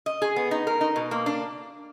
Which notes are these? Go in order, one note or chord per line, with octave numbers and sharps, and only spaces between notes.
D#5
G#4
B3
D#4
A#4
D#4
B2
A#3
D4